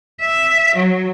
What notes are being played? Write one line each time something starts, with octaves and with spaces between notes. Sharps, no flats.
E5
F#3